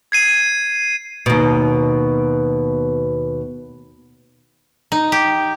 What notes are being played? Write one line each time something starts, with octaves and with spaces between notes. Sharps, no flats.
G#6 C7 D#7
D#2 B2
D#4
G4